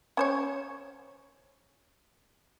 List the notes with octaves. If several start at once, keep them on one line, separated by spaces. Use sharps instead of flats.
C#4 C5 C#5